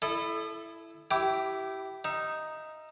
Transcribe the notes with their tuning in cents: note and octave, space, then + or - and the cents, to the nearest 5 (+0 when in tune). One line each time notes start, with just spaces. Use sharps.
E4 +10 A4 -15 D#5 -35
E4 +0 G4 -20 D6 +0
D#4 +0 E5 +25